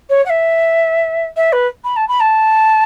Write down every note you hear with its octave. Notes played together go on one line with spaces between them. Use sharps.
C#5
F#5
E5
E5
B4
B5
A5
B5
A5